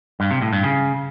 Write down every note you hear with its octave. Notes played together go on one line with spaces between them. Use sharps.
G2
C3
A2
G2
C#3